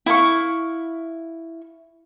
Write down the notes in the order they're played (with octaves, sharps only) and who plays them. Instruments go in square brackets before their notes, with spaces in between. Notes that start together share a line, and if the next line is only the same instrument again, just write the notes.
[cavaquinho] E4 F5 C#6